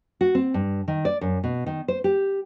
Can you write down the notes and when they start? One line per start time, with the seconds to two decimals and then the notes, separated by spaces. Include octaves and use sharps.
0.21 F#4
0.35 C4
0.54 G2
0.88 D#3
1.05 D5
1.21 F#2
1.44 B2
1.66 D#3
1.88 C5
2.04 G4